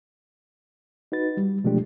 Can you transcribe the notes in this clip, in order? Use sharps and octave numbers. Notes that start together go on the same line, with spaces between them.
D#4 F#4 B4 A6
G3
B2 F3 G#3 A3 D4 G4